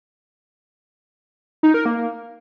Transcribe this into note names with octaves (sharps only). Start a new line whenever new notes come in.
D#4
A#4
A#3